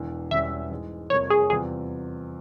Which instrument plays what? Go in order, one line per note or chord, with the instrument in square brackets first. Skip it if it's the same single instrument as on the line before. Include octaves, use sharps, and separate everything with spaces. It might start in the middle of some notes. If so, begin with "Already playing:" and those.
Already playing: [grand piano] E1 E2 E3
[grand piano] E1 E2 E3 G3 C#4 [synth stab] E5
[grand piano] G#2 E3 G#3
[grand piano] F2 C3 G3 A#3 [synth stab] C#5
[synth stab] G#4
[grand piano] E2 C3 G3 C4 F4 [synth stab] G#4